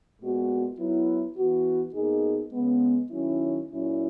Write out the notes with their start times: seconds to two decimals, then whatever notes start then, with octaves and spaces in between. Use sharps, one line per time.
0.20 A#2 G#3 B3 F#4
0.78 F#3 B3 E4
1.37 E3 B3 F#4
1.95 B2 A#3 D#4 G#4
2.53 C#3 G#3 B3
3.11 D#3 F#3 C#4 E4
3.70 A#2 F#3 C#4 E4